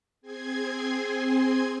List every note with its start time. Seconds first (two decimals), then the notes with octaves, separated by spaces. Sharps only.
0.21 C4 G#4 G#5 C6 G#6